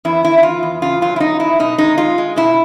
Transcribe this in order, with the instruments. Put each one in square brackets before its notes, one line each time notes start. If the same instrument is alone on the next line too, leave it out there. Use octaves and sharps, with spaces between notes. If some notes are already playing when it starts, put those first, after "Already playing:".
[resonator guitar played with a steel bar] E2 E4
E2 E4
E4
E2 F4
E2
C#3 F4
F#3 F4
E4
E2 D#4
F#3 E4
B2 D#4
G#3 D#4
G#3 F4
G#3
B2 E4